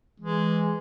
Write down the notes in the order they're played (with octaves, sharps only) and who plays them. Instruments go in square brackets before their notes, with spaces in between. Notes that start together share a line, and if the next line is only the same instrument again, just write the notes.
[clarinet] E3 [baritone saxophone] G#3